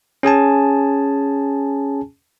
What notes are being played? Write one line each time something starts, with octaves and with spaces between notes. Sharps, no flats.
C#4 G#4 G#5 A5